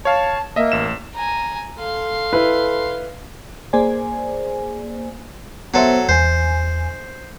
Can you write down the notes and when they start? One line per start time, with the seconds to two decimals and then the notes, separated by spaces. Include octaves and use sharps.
0.05 C#5 F5 A5
0.56 A#3 D#5 E5
0.72 A1 E7
1.14 G#5 A#5
1.80 A4 F5 C6
2.33 E4 B4
3.73 A#3 G#4 C5 D5 G#5
5.74 F#3 B3 A4 C5 E5
6.09 E2 C5 G#5